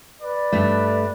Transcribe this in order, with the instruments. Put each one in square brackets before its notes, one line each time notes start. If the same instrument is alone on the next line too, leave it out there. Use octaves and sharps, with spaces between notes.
[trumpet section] B4 D5
[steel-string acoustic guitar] G2 A3